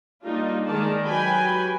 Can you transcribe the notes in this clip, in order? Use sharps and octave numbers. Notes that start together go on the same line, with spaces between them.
G3 A#3 D4 D#4 F4
D#3 G#3 D5 A5
F#3 G4 B4 G5 G#5 B5